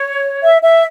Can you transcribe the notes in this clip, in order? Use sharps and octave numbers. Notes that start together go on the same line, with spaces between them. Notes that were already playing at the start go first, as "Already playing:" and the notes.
Already playing: C#5
E5
E5